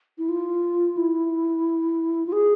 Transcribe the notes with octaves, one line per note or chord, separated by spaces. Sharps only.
E4
F4
E4
F4
G#4